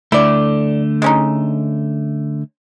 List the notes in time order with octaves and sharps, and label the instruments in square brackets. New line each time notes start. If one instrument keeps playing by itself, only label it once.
[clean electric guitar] D3 A3 [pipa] E4 D5
[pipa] G#3 C#4 D#4